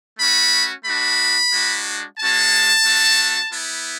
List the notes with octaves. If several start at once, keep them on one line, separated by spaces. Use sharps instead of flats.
A3 C#4 F#4 B5
A3 D4 F#4 B5
G#3 D4 F#4
G#3 C#4 F#4 A5
A3 D4 F#4
B3 E4